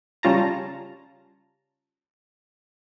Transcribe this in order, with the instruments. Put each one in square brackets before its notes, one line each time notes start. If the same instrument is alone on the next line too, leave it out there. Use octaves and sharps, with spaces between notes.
[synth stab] C#3 G3 C#4 F4 A5 A#5